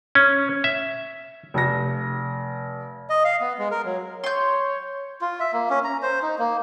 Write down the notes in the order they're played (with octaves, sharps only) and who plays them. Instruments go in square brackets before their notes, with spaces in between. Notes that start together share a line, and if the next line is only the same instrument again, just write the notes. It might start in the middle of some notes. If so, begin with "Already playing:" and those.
[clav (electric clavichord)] C#4
E5
[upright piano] F1 A#6
[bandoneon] D#5
F5
B3
G#3
A#4
F#3
[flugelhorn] C#5 [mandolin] C6 G6
[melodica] F4
E5
A#3
C#4
A#5
C5
D#4
A#3